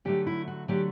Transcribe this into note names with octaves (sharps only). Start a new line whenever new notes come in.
D3 F#3 A3 G4
E4
F#4
D3 F#3 A3 G4